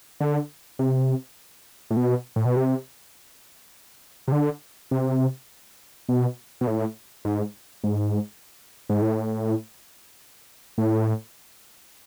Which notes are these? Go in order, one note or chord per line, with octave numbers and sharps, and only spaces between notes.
D3
C3
A2
B2
A2
B2
C3
C3
D3
C3
B2
B2
A2
G#2
G#2
G#2
A2
A2